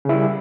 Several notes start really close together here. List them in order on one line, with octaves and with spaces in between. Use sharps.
C#3 E4 G3